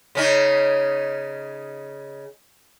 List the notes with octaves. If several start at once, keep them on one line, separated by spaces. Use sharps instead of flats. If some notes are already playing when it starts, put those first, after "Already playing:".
C#3 C#4 D#4